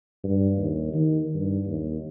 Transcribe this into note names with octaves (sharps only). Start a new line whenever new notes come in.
G2
D#2
D#3
G2
D#2